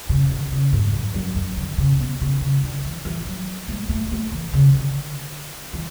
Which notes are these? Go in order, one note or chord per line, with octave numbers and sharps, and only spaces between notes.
C#3
D3
C#3
G#2
F#2
F#2
F#2
D3
C#3
B2
C#3
C#3
D3
E3
E3
F#3
G#3
A3
A3
E3
C#3
D3
E3